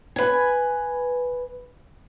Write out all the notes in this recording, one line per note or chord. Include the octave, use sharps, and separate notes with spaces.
B4 G#5